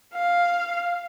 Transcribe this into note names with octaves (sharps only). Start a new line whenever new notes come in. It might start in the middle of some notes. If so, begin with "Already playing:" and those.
F5